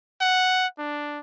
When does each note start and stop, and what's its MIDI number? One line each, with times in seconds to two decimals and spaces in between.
0.21 0.67 78
0.78 1.20 62